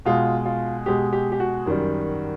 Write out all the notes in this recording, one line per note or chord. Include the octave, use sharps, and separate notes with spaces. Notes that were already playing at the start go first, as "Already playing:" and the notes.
B2 G#3 F4
F4
B2 G#3 G4
G4
G4
F#4
F#2 D#3 G3